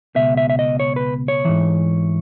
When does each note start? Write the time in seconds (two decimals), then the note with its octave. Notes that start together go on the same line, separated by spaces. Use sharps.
0.15 C#2 B2 E5
0.37 E5
0.50 E5
0.59 D#5
0.80 C#5
0.96 B4
1.28 C#5
1.45 G#2 E3